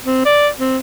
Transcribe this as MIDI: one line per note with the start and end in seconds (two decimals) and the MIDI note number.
0.05 0.21 60
0.25 0.49 74
0.59 0.78 60